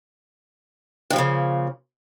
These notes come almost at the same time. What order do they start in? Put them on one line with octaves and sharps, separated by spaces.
G2 F3 A#2 C#3